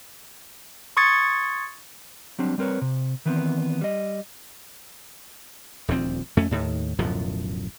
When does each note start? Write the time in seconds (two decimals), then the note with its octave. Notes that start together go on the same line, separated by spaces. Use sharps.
0.97 C6 C#6 D#6 G#6 A6 C#7
2.39 F#3 G3 C4 D4
2.58 G3 C4 A#4 B4 C#5
2.81 C3
3.25 D#3 E3 B3 C4
3.81 G3 D#5
5.88 D#1 D2 F3 C4
6.37 F2 A3 C#4
6.51 D#2 A2 D#3
6.99 D1 F#2 B2 F3